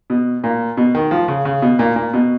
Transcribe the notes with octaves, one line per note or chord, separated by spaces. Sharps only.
B2
A#2
B2
D#3
F3
C#3
C#3
B2
A#2
A#2
B2